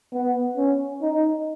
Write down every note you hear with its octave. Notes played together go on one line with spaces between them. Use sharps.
B3
C#4
D#4